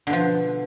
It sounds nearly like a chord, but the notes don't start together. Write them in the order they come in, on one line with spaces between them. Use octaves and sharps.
D3 B2 F3